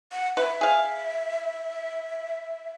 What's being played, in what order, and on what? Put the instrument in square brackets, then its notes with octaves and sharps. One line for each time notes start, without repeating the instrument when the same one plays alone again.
[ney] F#5
[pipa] B4 [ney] E5
[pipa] G#4 F5